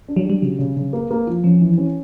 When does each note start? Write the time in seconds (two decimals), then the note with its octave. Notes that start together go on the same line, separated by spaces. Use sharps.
0.08 D4
0.16 F#3
0.26 G3 G4
0.42 C#3 F#3
0.59 C#3
0.76 C#3
0.93 A#3
1.11 A#3
1.27 F3
1.44 F3 C#4
1.61 E3
1.78 C#4